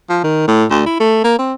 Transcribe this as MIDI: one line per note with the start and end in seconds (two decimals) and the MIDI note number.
0.10 0.19 53
0.24 0.47 51
0.48 0.64 45
0.71 0.84 38
0.86 0.97 64
1.00 1.20 57
1.24 1.37 58
1.39 1.53 60